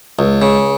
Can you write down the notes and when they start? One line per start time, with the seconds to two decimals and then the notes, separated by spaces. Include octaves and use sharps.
0.19 C#2
0.42 C#3